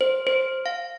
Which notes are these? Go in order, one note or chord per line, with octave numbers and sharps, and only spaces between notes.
C5
C5
F5